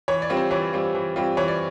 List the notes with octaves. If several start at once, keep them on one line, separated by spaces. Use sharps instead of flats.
E3 C#5
D5
G3 C4 F4
C5
E3 C#5
G3 C4 F4
E3
G3 C4 F4
E3 C#5
D5